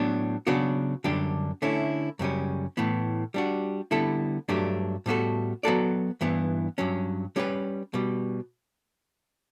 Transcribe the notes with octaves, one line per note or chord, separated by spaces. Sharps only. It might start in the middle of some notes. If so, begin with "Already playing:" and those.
Already playing: A2 F#3 B3 D4
C#3 F#3 B3 D4 F#4
F#2 D3 G3 D4 G4
D3 A3 C#4 E4
F#2 C#3 G3 C#4
A2 E3 B3
G3 D4 F#4
D3 G3 B3 E4 A4
G2 F#3 A3 D4 G4
A2 G3 B3 F#4 A4
F#3 B3 F#4 A4 D5
G2 E3 B3 E4
G2 F#3 C#4
G3 C#4 G4 B4
B2 G3